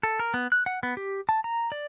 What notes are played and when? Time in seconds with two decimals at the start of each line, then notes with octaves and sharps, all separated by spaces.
0.03 A4
0.19 A#4
0.34 B3
0.52 F#6
0.66 F#5
0.83 B3
0.97 G4
1.29 A5
1.44 A#5
1.72 D5